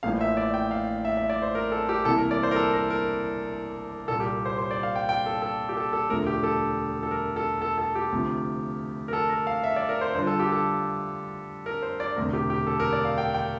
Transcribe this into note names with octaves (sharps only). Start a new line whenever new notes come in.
A1 A2 F3 A#3 F5
E5
D5
G5
F5
E5
E5
D5
C5
A#4
A4
G4
C2 C3 E3 A#3 E4 A4
A#4
D5
C5
A#4
A4
A#4
A#4
C2 A#2 G3 A#3 A4
G4
C5
C5
D5
F5
G5
G5
A4
A4
G4
A4
A4
E1 D2 D3 F3 A3 A#4
G4
A4
A4
A#4
A4
A4
A4
G4
D2 C3 F3
A#4
A4
A#4
F5
E5
D5
A#4
C5
G2 D3 G3 D4 F4 C5
A4
G4
A4
A#4
C5
D5
E1 D2 C3 A#4
G4
G4
A4
A#4
D5
F5
G5
G5